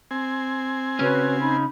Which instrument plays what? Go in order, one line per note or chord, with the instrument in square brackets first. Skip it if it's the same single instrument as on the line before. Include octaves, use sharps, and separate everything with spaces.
[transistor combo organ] C4 G#5
[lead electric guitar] C#3 C#4 [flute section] F#4 B4 C#5
[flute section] D#4 B5